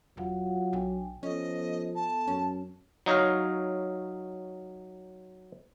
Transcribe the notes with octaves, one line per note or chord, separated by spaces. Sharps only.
E1 F#3 F4 F5 F#5
B1 D4 G5 G#5
F3 B3 C#4 A4 D#5
A5
F#2 C#4
F#3 D#4 C#5 D#5 F5